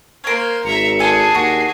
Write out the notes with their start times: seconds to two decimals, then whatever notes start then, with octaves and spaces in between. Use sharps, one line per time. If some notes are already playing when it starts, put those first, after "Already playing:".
0.24 A#3 A#4 C5 C#5 F6
0.65 G#1 E5 A#5 C#7
0.99 D4 G#4 A4 G#5
1.35 D#2 F#4 C7